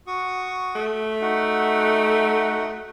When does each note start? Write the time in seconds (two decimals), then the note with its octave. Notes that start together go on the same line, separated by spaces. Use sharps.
0.07 F#4 C#6 D#6
0.76 A3
1.21 D#4 F#4 F#5